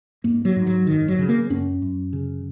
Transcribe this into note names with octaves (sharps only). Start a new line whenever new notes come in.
G#2 A#3
F#3
G#2
F#3
F#1 D#3
F#3
C#3
A#3
F#2 C#4
F#2
C#3